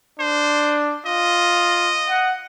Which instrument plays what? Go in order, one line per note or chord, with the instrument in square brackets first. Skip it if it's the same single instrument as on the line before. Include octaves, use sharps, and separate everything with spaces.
[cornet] D4 [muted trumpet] C5
[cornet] F4 [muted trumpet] D#5
[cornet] F#5